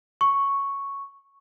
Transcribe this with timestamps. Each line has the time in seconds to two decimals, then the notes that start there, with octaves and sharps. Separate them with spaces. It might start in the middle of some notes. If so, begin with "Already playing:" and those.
0.21 C#6